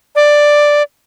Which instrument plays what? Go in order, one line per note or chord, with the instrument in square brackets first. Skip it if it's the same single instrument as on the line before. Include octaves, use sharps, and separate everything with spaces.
[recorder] D5